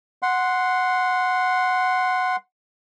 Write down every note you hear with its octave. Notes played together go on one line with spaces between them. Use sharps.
F#5 C6